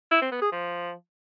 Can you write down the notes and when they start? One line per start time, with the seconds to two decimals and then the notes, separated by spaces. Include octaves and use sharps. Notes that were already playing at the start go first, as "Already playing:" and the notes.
0.11 E4
0.21 C4
0.32 B3
0.42 G#4
0.52 F3